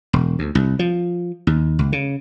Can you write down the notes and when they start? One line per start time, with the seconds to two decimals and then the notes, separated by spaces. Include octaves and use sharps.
0.13 E1
0.39 D2
0.55 C2
0.79 F3
1.47 D#2
1.79 C#2
1.92 C#3